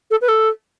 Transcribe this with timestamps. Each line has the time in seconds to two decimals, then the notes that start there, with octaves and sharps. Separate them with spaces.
0.10 A4
0.21 B4
0.28 A4